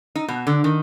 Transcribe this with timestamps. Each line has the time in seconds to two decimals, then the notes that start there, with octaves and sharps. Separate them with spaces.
0.15 D#4
0.28 B2
0.47 D3
0.64 D#3